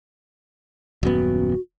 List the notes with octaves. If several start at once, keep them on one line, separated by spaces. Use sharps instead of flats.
D#1 F#2 B3 F#4